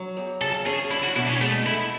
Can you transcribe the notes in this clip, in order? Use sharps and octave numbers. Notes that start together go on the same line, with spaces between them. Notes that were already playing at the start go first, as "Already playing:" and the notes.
Already playing: F#3
E2
C#3 A4
C#4 G#4
D4 E4
F#4
B2 E4
C#4
G#3 A3
E4 A4